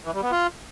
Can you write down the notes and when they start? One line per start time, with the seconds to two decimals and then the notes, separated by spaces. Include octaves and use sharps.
0.05 E3
0.14 G3
0.23 B3
0.31 F4